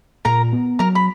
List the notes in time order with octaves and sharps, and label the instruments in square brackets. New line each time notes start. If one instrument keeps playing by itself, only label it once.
[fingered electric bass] A#2 [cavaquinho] A#4 A#5
[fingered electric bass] B3
[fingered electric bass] F#3 [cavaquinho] A#4 A#5
[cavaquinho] B5